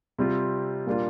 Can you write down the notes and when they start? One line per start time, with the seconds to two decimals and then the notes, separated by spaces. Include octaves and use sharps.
0.19 C3 G3 C4 F4
0.86 A#2 G3 A#3 D4 F4